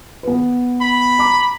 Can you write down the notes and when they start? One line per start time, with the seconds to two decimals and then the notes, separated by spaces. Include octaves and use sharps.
0.23 B3 B4
0.81 B5
1.19 A#5 D6